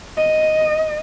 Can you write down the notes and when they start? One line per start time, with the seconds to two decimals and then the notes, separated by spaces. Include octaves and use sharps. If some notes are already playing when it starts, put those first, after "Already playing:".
0.17 D#5